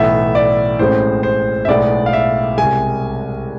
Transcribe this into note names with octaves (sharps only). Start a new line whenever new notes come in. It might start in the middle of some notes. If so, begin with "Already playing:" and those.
Already playing: B1 A2 E3 B3 E5
D5
A1 A2 G#3 C4 C5
C5
E5
B1 A2 G#3 B3 D5
F5
E5
C2 C3 G#3 G#5